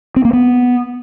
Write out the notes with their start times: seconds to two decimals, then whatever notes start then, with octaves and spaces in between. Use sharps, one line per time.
0.16 C4
0.25 A#3
0.33 B3